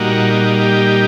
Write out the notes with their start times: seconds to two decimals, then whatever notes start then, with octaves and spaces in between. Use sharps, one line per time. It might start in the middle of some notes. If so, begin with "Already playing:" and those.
Already playing: A#2 G3 A#3 D#4 F#4
0.61 G4